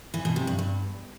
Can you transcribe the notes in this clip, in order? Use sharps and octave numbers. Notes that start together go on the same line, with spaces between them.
E3
B2
C3
G2
G2